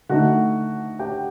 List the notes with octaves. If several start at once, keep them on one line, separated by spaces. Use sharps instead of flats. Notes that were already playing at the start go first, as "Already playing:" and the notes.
D3 A3 D#4 F#4 F#5
G4 G5